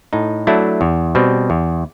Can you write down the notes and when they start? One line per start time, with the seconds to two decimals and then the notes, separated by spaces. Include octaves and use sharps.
0.13 A2 D#4
0.47 F#3 A3 D4 E4
0.81 E2
1.15 B2 G3 C4
1.50 E2